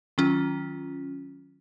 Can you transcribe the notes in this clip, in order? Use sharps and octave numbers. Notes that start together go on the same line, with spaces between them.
D#3 F#3 C#4 F4